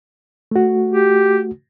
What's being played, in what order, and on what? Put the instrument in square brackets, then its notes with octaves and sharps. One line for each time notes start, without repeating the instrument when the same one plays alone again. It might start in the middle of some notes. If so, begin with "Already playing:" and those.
[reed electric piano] A3 F#4
[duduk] G4